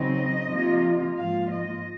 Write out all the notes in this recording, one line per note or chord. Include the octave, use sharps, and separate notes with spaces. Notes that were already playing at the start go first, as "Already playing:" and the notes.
Already playing: C#3 F#3 C4 D#4 D#5
C3 F3 A#3 F4
G#2 F3 A#3 F4 F5
D#5